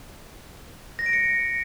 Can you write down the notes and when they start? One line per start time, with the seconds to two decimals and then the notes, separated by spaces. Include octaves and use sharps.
0.99 A#6
1.06 D7
1.13 C#7